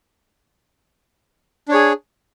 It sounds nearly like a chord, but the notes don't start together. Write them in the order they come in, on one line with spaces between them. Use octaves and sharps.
D4 C#5 G#4